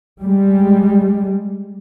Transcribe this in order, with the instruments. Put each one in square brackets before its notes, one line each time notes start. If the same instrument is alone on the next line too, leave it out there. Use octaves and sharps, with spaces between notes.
[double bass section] G3 G#3